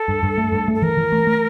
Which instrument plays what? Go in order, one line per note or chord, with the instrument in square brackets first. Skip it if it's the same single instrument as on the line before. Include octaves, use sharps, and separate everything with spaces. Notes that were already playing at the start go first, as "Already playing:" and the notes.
Already playing: [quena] A4
[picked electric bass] G2
G2
A3
G2
A3
[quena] A4
[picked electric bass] E3 [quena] A#4
[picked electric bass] E3
A3
A3